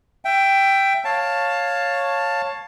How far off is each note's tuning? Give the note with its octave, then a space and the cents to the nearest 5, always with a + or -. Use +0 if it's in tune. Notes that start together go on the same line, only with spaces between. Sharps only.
E5 +20 G5 +0
C#5 +0 F5 +10 A5 +10